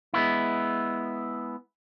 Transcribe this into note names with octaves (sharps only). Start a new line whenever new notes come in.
G#3 B3 E4